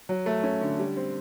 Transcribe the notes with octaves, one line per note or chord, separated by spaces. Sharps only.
F#3
A3
C#4
D3
G3
C4